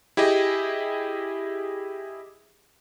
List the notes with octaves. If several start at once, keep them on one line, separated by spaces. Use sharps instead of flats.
E4 G4 G#4 D#5